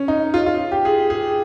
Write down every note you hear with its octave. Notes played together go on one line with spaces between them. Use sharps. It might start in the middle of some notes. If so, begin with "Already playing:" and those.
Already playing: C#4
D#4
F4
F4
G4
G#4
G#4